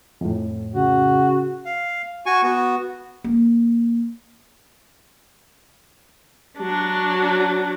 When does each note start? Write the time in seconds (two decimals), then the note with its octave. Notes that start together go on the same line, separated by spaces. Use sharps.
0.21 F2 A2
0.75 C#3 F#4
1.65 F5
2.26 F#4 G#5 C#6
2.43 B3 F#4
3.24 A#3
6.59 F#3 D4